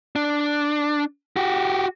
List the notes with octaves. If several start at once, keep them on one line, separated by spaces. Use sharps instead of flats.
D4
F#4 G4